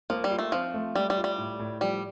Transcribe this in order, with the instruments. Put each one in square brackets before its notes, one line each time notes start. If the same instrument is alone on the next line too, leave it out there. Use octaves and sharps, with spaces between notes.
[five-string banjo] F3 [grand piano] A#3
[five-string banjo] G3
[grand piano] F4
[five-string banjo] A3
[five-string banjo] F3 [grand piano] C4
[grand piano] A3
[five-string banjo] G3 [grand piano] A3
[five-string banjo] G3
[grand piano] F4
[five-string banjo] G3
[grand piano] A2
A2
[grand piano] F3 [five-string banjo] G3